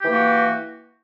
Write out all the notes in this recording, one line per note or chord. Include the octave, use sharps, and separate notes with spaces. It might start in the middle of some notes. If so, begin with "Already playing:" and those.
E3 A#3 F#4 G4